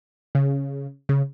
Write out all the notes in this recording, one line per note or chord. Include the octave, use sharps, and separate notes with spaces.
C#3
C#3